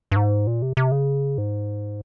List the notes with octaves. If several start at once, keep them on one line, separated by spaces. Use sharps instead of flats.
G2
G#2
A#2
C3
C3
C#3
G#2